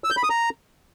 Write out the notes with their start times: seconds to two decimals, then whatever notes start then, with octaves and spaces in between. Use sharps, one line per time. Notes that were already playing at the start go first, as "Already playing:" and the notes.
0.04 E6
0.10 G6
0.17 B5
0.23 D#6
0.30 A#5